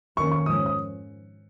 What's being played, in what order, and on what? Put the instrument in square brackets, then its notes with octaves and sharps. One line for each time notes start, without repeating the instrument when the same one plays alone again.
[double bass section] F2 D#3 A#3 C#4 [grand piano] C#6
[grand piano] C#6
[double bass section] G#2 F3 C#4 [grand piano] D#6
[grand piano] D#6